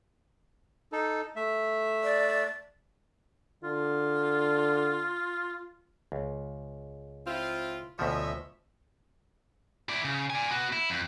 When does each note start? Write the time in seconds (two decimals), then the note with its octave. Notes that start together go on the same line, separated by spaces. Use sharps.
0.92 D#4 A4
1.36 A3 E5
2.04 D5
3.64 D3 F4
6.12 C#2
7.27 C4 E4 F4
7.99 D2 B2 F3 C#5 D#5 E5
9.89 E4 D5
10.05 C#3
10.30 D5 G#5
10.50 B3 F#4
10.73 E4
10.90 F2